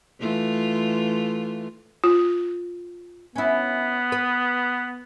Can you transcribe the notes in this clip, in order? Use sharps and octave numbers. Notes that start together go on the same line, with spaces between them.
E3 A3 F4
F4
B3 C#4 E4
B4